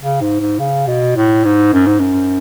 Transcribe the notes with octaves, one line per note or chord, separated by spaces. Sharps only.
C#3
G#2
G#2
C#3
B2
A2
G#2
F#2
G#2
F#2